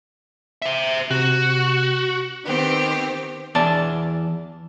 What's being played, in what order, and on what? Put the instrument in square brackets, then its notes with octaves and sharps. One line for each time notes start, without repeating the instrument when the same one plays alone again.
[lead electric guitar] C5 E5
[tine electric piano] C3 [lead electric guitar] F#4
[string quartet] D#3 B3 C4 G4
[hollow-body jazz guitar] E2 D5 A5